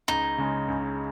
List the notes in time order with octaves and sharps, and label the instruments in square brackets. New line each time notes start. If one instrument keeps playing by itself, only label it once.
[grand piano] C#2 [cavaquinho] D#4
[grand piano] C#3 G#3
C#2